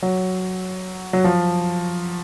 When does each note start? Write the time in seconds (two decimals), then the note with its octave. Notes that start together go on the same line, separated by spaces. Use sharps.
0.02 F#3
1.13 F#3
1.24 F3